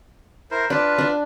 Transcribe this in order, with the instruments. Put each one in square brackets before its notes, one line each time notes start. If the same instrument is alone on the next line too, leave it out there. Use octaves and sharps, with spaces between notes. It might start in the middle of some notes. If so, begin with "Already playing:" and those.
[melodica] E4 A#4 C5
[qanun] D4 [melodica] F4 B4
[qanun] D4